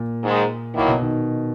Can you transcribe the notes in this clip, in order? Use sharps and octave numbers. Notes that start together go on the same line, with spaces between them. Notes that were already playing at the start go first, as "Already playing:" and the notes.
Already playing: A#2
G#2 D#3 G#3
D#3 F#3 A#3 E4
B2
D#3